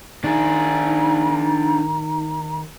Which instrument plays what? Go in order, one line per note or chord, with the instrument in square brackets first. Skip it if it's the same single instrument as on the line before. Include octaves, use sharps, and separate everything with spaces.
[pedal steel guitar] D#3 A5 [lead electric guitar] D4 G#4 [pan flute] D#4 [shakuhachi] A#5